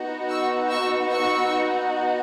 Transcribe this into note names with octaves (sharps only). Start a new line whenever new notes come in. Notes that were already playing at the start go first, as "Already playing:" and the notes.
Already playing: B3 D#4 F#4
C#6 E6
C#6 E6
C#6 E6